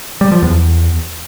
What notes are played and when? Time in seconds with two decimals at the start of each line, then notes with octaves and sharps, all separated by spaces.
0.21 G3
0.32 F3
0.42 E2